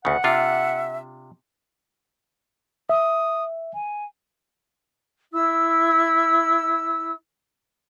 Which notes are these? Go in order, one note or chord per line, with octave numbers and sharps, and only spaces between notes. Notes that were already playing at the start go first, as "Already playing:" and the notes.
D2 C#3 F#5
C3 D4 F4 E5
E5 D#6
G#5
E4 E6